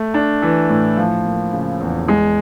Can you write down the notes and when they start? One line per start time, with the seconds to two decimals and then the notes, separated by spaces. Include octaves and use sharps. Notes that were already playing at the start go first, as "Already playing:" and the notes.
Already playing: A3
0.14 D4
0.42 E3
0.70 A2
0.97 F3
1.25 A#3
1.53 C#3
1.80 E2
2.08 G#3